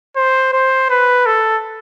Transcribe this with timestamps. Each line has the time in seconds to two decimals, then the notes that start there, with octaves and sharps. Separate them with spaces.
0.16 C5
0.53 C5
0.90 B4
1.26 A4